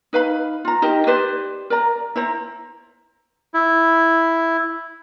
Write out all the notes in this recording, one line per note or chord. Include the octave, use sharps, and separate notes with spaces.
D#4 B4 F5 B5
F4 A#5
D#4 G4 A#4 D#5
G4 B4 C5 D5
A#4 D5 A#5
E4 C5 A#5
E4